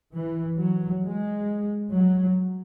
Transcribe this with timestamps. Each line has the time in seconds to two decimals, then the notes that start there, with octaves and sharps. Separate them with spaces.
0.14 E3
0.59 F#3
1.04 G#3
1.93 F#3